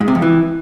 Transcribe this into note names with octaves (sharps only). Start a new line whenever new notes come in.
G#2
C3
F2
E3